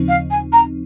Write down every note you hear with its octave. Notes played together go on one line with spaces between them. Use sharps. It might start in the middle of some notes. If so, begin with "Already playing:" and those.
Already playing: D#2 C#3 F3 C4 D#4
F5
G#5
A#5